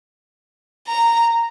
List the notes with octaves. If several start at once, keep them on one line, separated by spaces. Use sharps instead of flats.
A#5